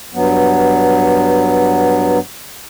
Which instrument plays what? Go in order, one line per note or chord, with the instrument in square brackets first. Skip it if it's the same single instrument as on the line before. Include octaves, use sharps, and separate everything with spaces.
[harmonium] G2 F#3 B3